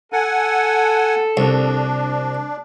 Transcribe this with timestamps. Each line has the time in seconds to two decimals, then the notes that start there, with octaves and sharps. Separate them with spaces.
0.12 A4 F#5 G#5
1.37 C2 D4